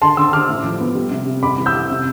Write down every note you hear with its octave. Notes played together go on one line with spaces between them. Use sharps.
D3 A5 C6
D3 C6 E6
D3 D6 F6
A2
F3
B3
G3
C3
C3
G3 B5 D6
E3
E6 G6
F2
C3